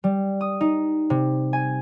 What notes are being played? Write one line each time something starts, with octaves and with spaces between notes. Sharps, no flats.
G3
D#6
D#4
C3
G#5